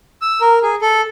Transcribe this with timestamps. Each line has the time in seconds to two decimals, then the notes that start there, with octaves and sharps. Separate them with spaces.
0.22 E6
0.41 A#4
0.63 G#4
0.82 A4